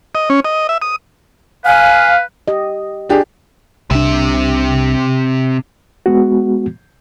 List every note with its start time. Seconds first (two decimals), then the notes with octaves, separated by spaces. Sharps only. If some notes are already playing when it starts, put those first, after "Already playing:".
0.15 D#5
0.30 C#4
0.45 D#5
0.69 E5
0.82 D#6
1.66 B4 F5 G#5
2.48 G4 D#5
3.09 D4 G4 G#4
3.91 C2 C3 D4 E5
6.06 G#3 B3 F#4